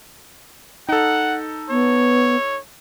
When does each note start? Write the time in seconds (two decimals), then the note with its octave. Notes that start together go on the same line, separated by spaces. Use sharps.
0.89 D#4 A4 F#5
1.70 B3 C#5